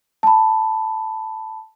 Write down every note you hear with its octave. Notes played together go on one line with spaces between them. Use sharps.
A5 B5